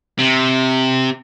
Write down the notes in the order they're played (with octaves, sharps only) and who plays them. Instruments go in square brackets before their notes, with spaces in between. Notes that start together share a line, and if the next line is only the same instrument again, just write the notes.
[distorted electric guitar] C3